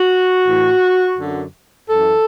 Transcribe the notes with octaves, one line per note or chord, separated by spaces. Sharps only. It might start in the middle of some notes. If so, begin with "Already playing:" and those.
Already playing: F#4
A2 E3
F#2 D3
F#2 E3 A4